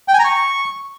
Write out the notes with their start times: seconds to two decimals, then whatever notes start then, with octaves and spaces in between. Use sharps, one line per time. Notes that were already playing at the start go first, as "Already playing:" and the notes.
0.08 G5
0.14 G#5
0.19 A#5
0.25 C#6